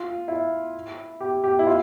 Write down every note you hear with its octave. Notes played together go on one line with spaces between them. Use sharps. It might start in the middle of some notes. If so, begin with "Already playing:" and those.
Already playing: F4
E4
G4
G4
E4
F4